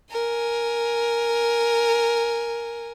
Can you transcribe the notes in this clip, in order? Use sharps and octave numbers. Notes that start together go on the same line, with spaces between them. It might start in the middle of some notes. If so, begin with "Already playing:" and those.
A#4 G#5